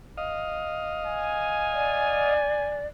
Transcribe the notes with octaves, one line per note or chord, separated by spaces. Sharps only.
D#5 F5
G#5
D5